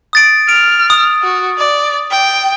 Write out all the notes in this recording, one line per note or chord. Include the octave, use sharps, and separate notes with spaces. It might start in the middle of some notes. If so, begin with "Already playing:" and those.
D#6 A6 D7
F6 D7
D#6
F#4
D5
G5